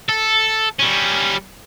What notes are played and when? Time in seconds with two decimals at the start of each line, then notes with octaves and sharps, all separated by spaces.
0.09 A4
0.79 G3 C#4